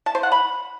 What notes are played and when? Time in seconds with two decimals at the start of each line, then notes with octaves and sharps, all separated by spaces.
0.06 A5
0.15 C5
0.23 F#5
0.32 B5